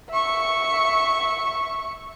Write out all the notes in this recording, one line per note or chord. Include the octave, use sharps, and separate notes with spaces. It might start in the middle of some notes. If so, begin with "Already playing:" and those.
E5 C#6